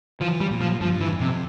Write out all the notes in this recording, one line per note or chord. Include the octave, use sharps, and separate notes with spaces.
E3 F3
G3
A#2
F3
G2 F3
E3
F2
C3